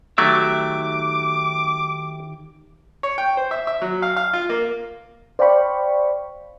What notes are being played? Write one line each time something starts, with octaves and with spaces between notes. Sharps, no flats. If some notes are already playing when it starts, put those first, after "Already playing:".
D#3 F#3 A3 G4 E5 D6
C#5
G5
C5
E5
E5
F#3
F5
F5
F4
A#3
C5 D5 F5 G5 B5 C#6